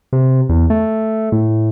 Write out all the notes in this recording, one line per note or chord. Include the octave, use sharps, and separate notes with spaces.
C3
E2
A3
A2